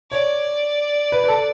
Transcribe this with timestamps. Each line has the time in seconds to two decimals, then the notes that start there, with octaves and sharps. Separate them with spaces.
0.11 C#5 D5
1.12 B4
1.24 B4
1.28 A4